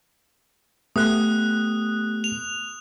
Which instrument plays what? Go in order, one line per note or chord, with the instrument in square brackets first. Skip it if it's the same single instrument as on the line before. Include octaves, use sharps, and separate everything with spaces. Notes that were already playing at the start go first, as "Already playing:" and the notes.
[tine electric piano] A3 B3 G4 [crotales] D#6 F#6
[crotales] F7